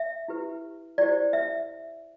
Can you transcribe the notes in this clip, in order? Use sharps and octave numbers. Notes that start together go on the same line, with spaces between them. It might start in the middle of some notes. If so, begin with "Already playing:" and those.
Already playing: E5
E4 G4 B4
E4 G4 C5 D5
E5